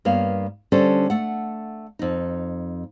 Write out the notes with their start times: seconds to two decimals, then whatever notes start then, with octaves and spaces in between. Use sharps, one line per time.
0.05 G2 A#3 B3 C#5 F5
0.72 D3 G3 C#4 D4 A4 C5
1.10 A3 F#5
1.99 F2 D#4